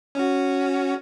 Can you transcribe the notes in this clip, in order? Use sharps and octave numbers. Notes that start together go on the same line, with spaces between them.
C#4 F#4